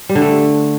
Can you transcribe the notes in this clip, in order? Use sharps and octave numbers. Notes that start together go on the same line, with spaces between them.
G3
D3
A3